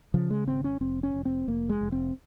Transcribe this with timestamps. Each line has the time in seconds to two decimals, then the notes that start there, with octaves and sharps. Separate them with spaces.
0.14 C#3 F3
0.30 G#3
0.48 G#1 C4
0.64 C#4
0.81 F1 C4
1.03 C#4
1.14 F1
1.25 C4
1.47 F1 A#3
1.69 G#3
1.81 F1
1.92 C4